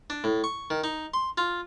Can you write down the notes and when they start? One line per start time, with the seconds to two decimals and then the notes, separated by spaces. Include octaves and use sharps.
0.10 D4
0.24 A2
0.44 C#6
0.70 D#3
0.84 D#4
1.14 C6
1.38 F4